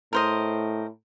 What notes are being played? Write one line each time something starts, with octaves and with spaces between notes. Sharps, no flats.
A2 A#4 C5 D#5